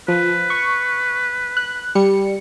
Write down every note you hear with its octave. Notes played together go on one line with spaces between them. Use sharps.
F3 B4
C#6
F#6
G3 C#7